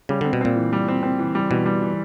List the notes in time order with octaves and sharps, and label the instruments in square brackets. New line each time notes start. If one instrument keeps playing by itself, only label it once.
[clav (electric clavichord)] C#3 [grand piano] G3
[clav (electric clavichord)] D3 [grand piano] C4
[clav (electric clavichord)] B2
[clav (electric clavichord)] A#2 [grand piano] C4
[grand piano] E3
G3
C4
C4
E3
G3
[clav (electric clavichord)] B2 [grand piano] E3
[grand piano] G3
E3